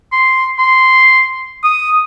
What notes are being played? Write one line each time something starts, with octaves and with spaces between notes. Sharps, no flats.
C6
C6
D#6